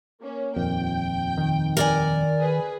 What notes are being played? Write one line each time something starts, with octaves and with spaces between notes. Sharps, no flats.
A#3 C#4
D#1 F2 G5
D#3
A#4 D5 G#5
G#4 B4